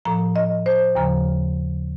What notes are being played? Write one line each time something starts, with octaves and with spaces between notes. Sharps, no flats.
A2 F3 A#5
D#5
C5
D#2 C#3 F3 A#5